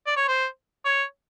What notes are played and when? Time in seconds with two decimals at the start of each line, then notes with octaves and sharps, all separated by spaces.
0.07 D5
0.16 C#5
0.28 C5
0.85 C#5